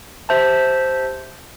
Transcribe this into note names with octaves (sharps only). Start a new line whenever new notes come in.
G4 C5 E5 A5